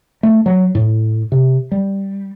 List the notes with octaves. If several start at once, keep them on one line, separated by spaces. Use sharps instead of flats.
A3
F#3
A2
C3
G3